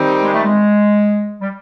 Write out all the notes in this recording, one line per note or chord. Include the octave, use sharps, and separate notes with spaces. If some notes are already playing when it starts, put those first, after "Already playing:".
Already playing: D#3 G3 C4 D#4 G4
G#3
A3
G#3
G3